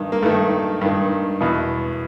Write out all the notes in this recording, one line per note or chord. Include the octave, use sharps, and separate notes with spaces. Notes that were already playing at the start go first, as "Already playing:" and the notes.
Already playing: G2 D#3
A#3
G2 D#3 A3
G2 D#3
E2 B2